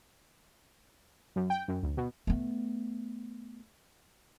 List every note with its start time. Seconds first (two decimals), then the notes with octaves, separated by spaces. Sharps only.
1.36 F#2
1.50 G5
1.68 F#2
1.83 D2
1.97 B2
2.27 A3 B3